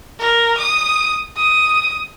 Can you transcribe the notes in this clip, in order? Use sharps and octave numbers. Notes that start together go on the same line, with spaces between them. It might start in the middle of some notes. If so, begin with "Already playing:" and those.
A#4
D#6
D#6